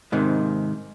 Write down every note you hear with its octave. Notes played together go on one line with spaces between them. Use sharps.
G#2 C3 D#3